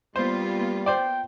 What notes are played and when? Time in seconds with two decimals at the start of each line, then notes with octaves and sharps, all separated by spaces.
0.16 G3 A#3 B3 F4 C5
0.86 C5 D5 G5